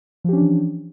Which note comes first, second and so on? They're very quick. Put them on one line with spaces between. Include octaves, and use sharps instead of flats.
F3 G4 C#4 D4 E3